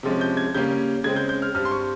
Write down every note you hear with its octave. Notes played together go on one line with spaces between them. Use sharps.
C3 F3 G#3 C#4
G6
G#6
C#3 G3 A#3 C#4 G6
C#3 G#3 C4 G#6
G6
G6
F6
G2 G3 C4 F6
C6
C#6